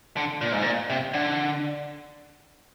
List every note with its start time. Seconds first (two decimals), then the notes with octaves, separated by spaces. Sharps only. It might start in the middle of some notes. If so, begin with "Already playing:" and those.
0.17 D3
0.41 A#2
0.52 G#2
0.62 A#2
0.90 C3
1.14 D3